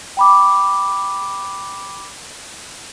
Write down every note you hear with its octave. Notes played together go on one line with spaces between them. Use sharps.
G5 B5 D6